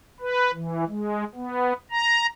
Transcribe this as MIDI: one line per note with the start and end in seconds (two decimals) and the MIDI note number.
0.21 0.52 71
0.54 0.84 52
0.88 1.24 56
1.35 1.73 59
1.91 2.26 82